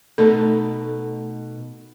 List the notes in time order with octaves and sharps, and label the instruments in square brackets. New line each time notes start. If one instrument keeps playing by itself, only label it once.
[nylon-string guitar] B2 A3 D#4 [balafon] A4